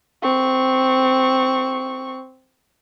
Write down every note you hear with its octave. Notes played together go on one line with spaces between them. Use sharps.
C4 C#6